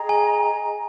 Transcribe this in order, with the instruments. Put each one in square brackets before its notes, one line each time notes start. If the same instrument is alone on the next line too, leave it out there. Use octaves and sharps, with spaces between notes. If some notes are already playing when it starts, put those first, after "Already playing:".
Already playing: [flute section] G#4 D#5 G5 A#5
[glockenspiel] G#5